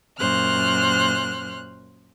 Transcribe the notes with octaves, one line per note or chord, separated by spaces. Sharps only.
F#2 A#2 C5 F6 F#6